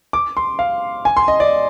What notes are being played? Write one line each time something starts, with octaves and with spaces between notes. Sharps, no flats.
D6
C6
F5
G#5
C6
D#5
D5